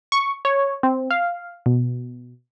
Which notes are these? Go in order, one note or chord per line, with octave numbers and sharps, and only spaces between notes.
C#6
C#5
C4
F5
B2